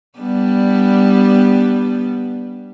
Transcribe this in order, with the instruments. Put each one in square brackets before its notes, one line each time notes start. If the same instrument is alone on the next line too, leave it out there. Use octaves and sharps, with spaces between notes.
[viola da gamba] G3 B3 D4